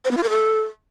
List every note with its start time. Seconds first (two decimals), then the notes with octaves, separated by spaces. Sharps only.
0.05 C5
0.11 B3
0.17 F4
0.23 A#4
0.29 A4